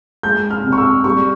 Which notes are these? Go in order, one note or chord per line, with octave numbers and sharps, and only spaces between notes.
G#3 G6
F6
C2
C#6
E6
G3 C#6